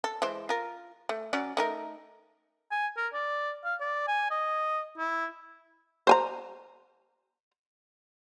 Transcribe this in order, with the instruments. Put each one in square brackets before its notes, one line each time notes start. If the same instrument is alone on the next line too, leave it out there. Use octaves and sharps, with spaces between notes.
[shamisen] A4
E3 G#3 C5
F4 A#4
A3
F#3 C#4 D5
A3 D#4 A#4
[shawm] G#5
A#4
D5
F5
D5
G#5
D#5
E4
[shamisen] C5 G#5 A#5